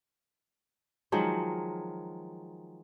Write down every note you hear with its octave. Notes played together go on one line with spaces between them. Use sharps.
D#3 F3 F#3 G#3